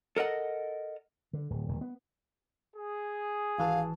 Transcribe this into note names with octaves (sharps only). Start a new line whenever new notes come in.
A4 A#4 D#5 F#5
D3
D1
D#1
B3
G#4
G#1 E3 F5 A5